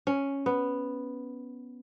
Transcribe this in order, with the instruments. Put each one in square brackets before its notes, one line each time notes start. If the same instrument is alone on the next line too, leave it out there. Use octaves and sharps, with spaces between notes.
[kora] C#4
B3